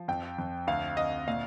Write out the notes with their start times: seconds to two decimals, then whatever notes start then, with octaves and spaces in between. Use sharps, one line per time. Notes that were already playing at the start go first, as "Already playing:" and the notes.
Already playing: F3
0.08 F2 G5
0.38 F2
0.67 D2 F5
0.97 D2 D#5
1.28 A#2 F5